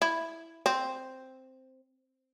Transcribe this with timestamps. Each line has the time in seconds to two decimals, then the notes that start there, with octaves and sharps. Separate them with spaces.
0.02 E4
0.66 C4